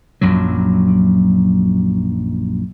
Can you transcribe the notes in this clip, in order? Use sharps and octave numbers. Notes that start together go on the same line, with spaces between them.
A#1 F#2 A#2 F#3